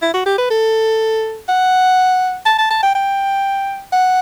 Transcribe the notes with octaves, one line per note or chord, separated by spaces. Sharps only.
E4
F#4
G4
B4
A4
F#5
A5
A5
A5
G5
G5
F#5